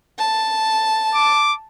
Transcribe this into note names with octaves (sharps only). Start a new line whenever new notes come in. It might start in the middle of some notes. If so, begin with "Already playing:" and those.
A5
D6